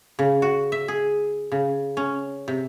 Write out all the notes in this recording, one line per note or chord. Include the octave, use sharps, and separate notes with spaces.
C#3
F#4
E5
G#4
C#3
C#4
C3